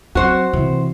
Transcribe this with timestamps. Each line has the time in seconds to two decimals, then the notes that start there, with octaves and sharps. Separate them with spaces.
0.15 F#3 C4 F#4 C5
0.53 C2 E3